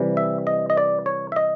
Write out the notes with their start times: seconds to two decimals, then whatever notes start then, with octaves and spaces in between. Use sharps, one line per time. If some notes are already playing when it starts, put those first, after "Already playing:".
Already playing: C3 E3 G3
0.17 E5
0.47 D#5
0.70 D#5
0.77 D5
1.06 C#5
1.32 E5
1.36 D#5